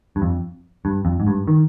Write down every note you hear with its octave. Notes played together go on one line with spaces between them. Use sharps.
G2
F2
G2
F2
G#2
G2
D#3